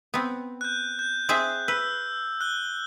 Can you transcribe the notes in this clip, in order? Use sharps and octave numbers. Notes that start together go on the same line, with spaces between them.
B3 C4
F#6 G6
G6
C4 G#4 E5
B4 E6
F#6 G7